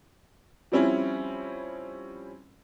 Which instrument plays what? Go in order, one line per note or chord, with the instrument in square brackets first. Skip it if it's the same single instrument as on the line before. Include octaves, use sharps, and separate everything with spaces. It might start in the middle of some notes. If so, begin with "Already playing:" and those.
[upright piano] F3 G3 C4 C#4 E4